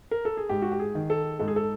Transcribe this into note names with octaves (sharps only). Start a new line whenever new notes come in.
A#4
A4
G#4
G#2 G4
F#4
G4
G#4
D#3
A4
G#2 A4
G#4
A4